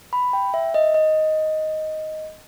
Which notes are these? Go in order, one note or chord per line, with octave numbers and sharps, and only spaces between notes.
B5
G5
E5
D#5
D#5